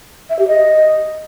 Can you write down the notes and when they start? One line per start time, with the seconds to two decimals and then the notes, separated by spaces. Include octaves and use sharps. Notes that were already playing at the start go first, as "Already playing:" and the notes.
0.30 E5
0.39 G4
0.48 D#5